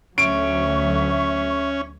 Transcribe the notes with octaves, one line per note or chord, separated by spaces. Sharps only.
D2 F#3 C#4 E5 C#6 D7